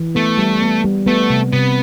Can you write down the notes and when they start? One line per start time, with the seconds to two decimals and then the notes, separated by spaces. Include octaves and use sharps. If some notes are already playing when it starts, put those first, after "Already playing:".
Already playing: E3
0.15 A3 B3
0.38 G3
0.62 B3
0.84 G3
1.06 A3 B3
1.30 C3
1.53 C3 B3